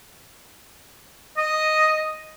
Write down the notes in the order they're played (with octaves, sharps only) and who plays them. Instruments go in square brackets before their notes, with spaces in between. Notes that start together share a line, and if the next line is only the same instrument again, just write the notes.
[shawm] D#5